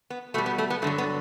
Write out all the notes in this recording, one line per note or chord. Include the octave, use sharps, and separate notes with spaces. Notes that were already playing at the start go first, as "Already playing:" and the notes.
B3
B2 G3 A3
B3
A3
B3
G2 D3 F#3 A3
B3